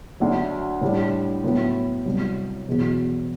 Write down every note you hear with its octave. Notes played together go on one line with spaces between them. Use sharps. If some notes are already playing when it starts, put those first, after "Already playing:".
D2 D3 F#3
A2 G3 D4
A2 F#3 B3 E4
C2 C3 F#3
E2 B2 F#3 B3